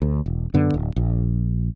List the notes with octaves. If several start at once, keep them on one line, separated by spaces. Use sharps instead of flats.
D2
E1
F#2 D3 B3
D1
A#1